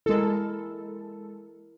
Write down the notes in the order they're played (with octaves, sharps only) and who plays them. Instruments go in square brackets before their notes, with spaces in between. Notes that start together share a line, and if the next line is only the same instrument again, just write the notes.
[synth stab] G#3 A4 [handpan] E4 A#4